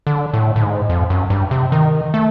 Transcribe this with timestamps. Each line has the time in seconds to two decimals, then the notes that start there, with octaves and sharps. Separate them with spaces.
0.07 D3
0.34 A2
0.56 A2
0.62 G#2
0.89 F2
1.10 F#2
1.30 G2
1.51 C3
1.72 D#3
2.14 A3